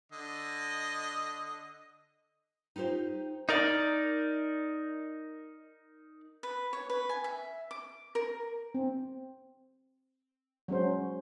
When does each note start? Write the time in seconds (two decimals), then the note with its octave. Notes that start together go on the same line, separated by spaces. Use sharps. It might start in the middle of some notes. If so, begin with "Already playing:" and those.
0.12 D3 D#5
2.76 D#4 F4 G4 C5
3.49 D#4 A#4 D5
6.43 B4
6.73 C#5
6.90 B4
7.09 G#5
7.24 E5
7.71 D6
8.15 A#4
8.75 C4
10.68 F#3 G#3 C#4 C5